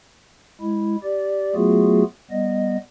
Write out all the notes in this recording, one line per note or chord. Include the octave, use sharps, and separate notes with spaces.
G#3 E4
G4 D5
F#3 A3 B3 F4 F#4 G#4
G3 B3 D#5